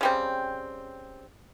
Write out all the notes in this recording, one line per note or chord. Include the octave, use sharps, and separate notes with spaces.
C#3 G3 C4